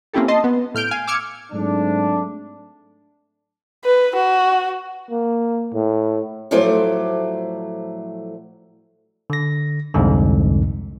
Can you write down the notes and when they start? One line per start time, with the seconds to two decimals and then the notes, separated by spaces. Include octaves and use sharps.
0.13 A#3 C4 C#4 E4 G4 A4
0.28 D#5 A5 C6
0.44 B3
0.74 A2 F6 G6 D7
0.91 F5 G#5
1.07 D6 E6 F6 G#6 C#7
1.52 G#2 F#3 A3 C4 D4
3.84 B4
4.16 F#4
5.10 A#3
5.74 A2
6.51 A2 F3 F#3 A3 C5 D5
9.30 D3 A#6
9.94 C2 F2 G#2 D3